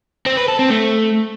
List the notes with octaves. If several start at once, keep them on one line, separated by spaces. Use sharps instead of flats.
C4
B4
A4
C4
A3